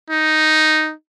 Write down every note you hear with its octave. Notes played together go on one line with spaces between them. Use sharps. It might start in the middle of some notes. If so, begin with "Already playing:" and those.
D#4